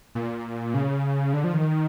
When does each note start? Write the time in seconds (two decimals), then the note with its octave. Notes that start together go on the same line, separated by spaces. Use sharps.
0.15 A#2
0.74 C#3
1.33 D3
1.44 F3
1.54 D#3